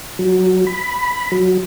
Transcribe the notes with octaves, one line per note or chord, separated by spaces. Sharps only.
F#3
B5
F#3